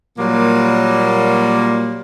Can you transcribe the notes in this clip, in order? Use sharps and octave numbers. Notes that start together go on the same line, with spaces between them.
A#2 F#3 G3 A#3